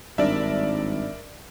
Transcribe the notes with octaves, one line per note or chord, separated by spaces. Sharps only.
G#1 G2 D4 A#4 D5 E5